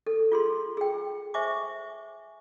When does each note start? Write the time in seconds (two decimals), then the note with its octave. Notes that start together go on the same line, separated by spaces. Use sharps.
0.06 A4
0.32 F4 G#4 C6
0.77 G#4 G5
1.34 C5 E5 G#5 C#6 D6